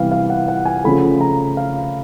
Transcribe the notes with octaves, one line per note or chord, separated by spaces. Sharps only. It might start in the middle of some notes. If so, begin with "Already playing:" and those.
Already playing: C3 E3 G3 B3 F5
F5
F#5
F#5
G#5
C#3 F3 A3 B5
A#5
F5